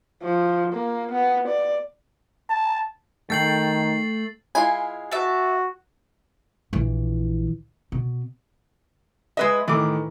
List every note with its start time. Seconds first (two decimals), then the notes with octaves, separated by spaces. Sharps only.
0.24 F3
0.74 A#3
1.12 B3
1.49 D5
2.49 A5
3.30 D#3 A3 A4 G5 A6 C7 F#7
4.55 G#3 E4 F4 G#5
5.12 F#4 E5 A5
6.73 A#1 E3
7.92 B2
9.37 G#3 B4 D#5 E5
9.68 A2 D#3 E3 D6